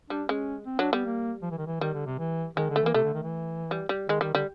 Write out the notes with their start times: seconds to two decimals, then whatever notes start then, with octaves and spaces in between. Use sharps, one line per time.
0.10 G3 D4
0.29 G#3 C#4
0.66 C4
0.79 F#3 D4
0.92 G3 B3
1.05 A#3
1.42 F3
1.51 E3
1.58 D#3
1.67 E3
1.81 D#3 G3
1.94 D3
2.06 C3
2.19 E3
2.57 D#3 G#3
2.70 D3
2.76 A3
2.83 E3 A#3
2.94 C3 A3
3.04 D3
3.14 D#3
3.23 E3
3.71 G3
3.89 G3
4.08 D#3 G#3
4.21 D#3 G3
4.34 D3 G3